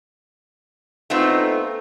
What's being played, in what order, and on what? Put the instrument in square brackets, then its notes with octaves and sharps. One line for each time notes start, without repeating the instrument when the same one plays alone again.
[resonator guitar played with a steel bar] A3 B3 C4 D#4 F4